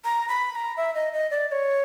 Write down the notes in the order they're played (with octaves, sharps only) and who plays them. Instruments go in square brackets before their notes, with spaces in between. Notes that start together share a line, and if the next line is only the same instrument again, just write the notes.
[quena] A#5
B5
B5
A#5
E5
D#5
D#5
D5
D5
C#5